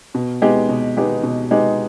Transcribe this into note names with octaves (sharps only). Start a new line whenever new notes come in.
B2
G#3 B3 D#4 G4
B2
G#3 B3 D#4 G4
B2
G#3 B3 D#4 G4